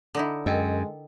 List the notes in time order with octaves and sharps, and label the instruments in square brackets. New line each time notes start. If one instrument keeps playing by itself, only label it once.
[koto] D3 D#4 E4
[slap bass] F#2 [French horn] G#3 [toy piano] A#4 D#5 G5